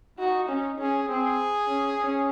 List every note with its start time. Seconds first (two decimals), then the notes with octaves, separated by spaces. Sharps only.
0.18 D#4 F#4
0.48 C#4
0.78 C#4 G#4
1.08 C4 G#4
1.68 C#4
1.99 C#4